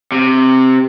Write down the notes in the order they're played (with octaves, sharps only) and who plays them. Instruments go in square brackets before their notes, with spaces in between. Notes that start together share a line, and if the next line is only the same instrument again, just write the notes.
[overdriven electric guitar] C3